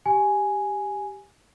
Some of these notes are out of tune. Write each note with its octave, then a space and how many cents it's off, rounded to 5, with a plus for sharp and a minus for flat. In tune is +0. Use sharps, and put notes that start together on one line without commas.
G4 +0 G#5 +0